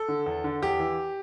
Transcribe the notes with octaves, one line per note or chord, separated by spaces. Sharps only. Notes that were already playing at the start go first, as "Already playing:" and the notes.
Already playing: A4
D3
E2
D3
E2 G4
E3